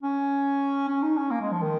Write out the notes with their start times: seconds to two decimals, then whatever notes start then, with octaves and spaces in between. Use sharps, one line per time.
0.03 C#4
0.88 C#4
1.02 D#4
1.17 C#4
1.31 A#3
1.42 G#3
1.52 F3
1.62 D#3